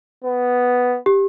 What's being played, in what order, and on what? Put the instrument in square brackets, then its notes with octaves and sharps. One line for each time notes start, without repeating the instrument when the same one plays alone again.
[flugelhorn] B3
[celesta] G4